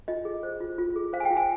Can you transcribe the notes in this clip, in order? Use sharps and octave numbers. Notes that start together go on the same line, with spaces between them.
F4 D#5
G#4
C5
F4
F4
G#4
C5 F5
G#5
G5
F4
G#5